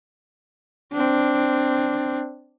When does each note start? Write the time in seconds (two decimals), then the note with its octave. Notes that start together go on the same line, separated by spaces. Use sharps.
0.93 C4 D4